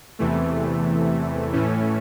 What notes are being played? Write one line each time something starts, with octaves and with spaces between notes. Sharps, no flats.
E2 C3 E3 A3
A2 E3 A3 C#4